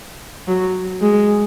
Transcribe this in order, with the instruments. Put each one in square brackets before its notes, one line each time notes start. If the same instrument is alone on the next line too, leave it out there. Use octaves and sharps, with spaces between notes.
[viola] F#3
G#3